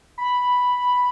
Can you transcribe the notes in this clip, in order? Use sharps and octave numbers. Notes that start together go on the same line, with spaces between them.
B5